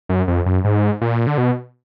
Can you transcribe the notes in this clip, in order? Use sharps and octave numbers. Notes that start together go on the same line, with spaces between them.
F#2
F2
F#2
G#2
A#2
D3
B2